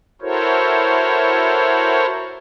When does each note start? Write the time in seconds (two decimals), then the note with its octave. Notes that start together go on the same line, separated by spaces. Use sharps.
0.22 E4 F#4 A4 A#4 C5 C#5